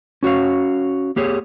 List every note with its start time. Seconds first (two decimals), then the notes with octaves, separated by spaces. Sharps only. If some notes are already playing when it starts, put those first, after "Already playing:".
0.23 C#4 F#4 C#5 F5
1.16 A#3 G4 G#4 C#5